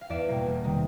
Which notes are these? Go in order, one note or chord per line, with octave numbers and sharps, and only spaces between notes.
F5
E2 D5 E5
B2 G3 A#3
E1
C3 D#3 G3